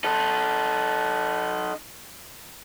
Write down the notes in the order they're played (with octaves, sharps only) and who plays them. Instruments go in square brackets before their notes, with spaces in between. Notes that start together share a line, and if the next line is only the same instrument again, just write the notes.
[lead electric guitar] D#4 A4